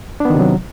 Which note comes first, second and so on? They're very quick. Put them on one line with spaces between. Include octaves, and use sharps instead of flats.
D4 B3 D#3 C3 F#3